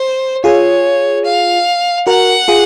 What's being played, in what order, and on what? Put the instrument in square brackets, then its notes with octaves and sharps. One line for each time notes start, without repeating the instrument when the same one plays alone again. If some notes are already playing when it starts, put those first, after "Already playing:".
Already playing: [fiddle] C5
[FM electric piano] F4 G#4 [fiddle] C#5
[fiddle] F5
[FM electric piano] F#4 A#4 [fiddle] F#5
[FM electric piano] F4 G#4